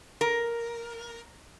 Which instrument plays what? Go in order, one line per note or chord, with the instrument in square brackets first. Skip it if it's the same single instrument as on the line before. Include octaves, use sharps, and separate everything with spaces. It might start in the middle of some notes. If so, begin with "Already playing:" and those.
[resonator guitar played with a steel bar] A#4